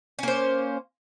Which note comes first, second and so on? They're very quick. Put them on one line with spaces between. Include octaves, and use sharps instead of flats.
C#4 A#3 C5